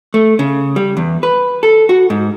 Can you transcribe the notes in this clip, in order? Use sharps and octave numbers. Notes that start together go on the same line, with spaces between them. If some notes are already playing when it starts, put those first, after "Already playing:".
A3
C#3
G3
E2
B4
A4
F#4
G#2